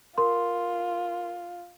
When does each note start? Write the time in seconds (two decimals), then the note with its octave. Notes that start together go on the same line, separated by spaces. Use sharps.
0.18 F4 A#4 C6